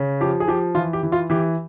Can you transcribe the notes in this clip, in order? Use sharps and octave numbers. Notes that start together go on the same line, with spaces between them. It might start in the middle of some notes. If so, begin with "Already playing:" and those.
Already playing: C#3
F3 G4
G#4
F3 G4
E3 F4
G4
E3
F4
E3 G4